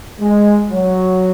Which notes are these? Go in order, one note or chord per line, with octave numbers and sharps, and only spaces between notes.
G#3
F#3